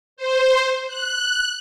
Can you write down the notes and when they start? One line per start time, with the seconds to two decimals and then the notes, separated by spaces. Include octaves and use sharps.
0.17 C5
0.87 F#6